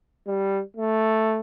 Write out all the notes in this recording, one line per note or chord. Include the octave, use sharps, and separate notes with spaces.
G3
A3